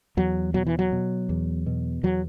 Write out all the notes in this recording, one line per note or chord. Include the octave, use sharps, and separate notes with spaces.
E2 F#3
B2 F#3
E3
F#3
B2
E2
B2
E2 F#3